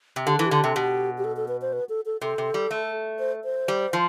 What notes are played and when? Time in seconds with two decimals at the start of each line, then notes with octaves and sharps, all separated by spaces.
0.16 C3
0.26 D3 G4
0.36 E3 A4
0.46 G4
0.51 D3
0.64 C3 A4
0.76 B2 G4
1.18 G4
1.24 A4
1.37 A4
1.48 B4
1.62 C5
1.73 B4
1.89 A4
2.06 A4
2.21 C3 A4
2.38 C3
2.54 G3
2.71 A3
3.19 C5
3.44 C5
3.68 G3
3.93 F3